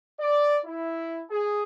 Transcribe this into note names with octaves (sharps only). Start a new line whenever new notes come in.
D5
E4
G#4